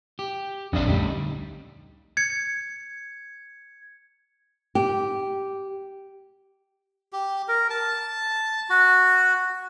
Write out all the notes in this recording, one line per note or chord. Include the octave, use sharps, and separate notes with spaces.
G4
A#1 F2 C#4 D4 E5
D2 G3 D#4 G4
G#6 C#7
G4
G4
A#4
A5
F#4